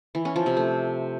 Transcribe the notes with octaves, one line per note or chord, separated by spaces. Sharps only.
E3
C#4
F3
C3
A3